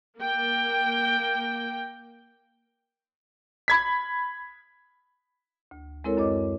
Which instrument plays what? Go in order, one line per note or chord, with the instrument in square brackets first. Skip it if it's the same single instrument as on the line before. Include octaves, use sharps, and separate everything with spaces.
[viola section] A#3 G5
[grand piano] B5 G#6 B6
[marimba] D2
G#3 C4 E4 A4 A#4 C#5
F#2 C4 C#5 D#5 D6